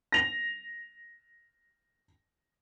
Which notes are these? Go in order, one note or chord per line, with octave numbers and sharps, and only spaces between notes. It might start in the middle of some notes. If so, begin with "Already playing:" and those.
A#6 F7